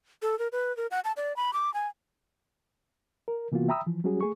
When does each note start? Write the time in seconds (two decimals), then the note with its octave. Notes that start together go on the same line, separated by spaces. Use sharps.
0.22 A4
0.39 A#4
0.52 B4
0.77 A#4
0.91 F#5
1.04 A5
1.17 D5
1.36 B5
1.53 D6
1.74 G#5
3.28 A#4
3.52 C3 E3 A#3 B3 F4 F#4
3.68 E5 G5 A#5 B5 D#6 E6
3.87 E3 F3
4.04 F#3 G3 C#4 F#4 G#4
4.21 A3 G#4 C#6